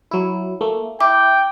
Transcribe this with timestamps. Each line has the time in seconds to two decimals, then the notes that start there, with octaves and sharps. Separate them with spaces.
0.11 F#3 E4
0.61 A3 A#3
1.01 E4 G5 D6